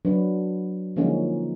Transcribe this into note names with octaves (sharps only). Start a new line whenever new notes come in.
F#3 D4 B4
D3 F3 G#3 A#3 C#4 D#4